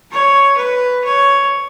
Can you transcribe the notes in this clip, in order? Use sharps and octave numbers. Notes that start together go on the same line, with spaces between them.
C#5
B4
C#5